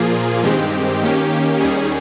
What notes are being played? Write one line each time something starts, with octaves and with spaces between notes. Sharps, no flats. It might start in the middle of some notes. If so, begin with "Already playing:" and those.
Already playing: A#2 F3 A#3 F4 G#4
G2 D#3 G#3 C4 G4
D#3 A#3 C#4 G4
D#2 D#3 G3 C#4 G#4